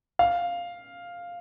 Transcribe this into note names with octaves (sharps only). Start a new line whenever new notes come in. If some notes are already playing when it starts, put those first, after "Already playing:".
F5